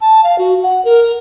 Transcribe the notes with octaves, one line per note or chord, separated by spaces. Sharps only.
A5
F5
F#4
F#5
A#4